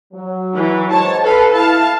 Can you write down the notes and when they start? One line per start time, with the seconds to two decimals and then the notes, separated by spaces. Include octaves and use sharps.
0.13 F#3
0.56 E3
0.91 G#2 C#5 A5
1.24 A4 B4 F5
1.54 E4 F5 A5